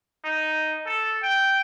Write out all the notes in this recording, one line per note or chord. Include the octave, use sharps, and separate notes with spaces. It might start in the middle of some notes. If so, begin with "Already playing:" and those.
D#4
A4
G5